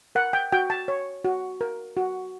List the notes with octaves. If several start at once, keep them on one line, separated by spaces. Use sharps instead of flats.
A#4 F#5
G5
F#4 G5
A5
C#5
F#4
A#4
F#4